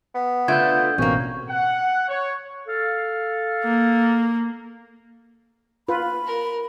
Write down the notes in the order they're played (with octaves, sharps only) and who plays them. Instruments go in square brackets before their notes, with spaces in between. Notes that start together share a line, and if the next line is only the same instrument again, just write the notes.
[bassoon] B3
[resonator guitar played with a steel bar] D3 A3 [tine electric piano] F4 B4 [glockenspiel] G6 G#6
[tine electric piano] A1 B2 C4 [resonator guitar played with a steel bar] A#3 C#4
[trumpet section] F#5
C#5
[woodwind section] A4 F5
[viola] A#3
[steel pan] F4 B4 [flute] B5
[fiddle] A#4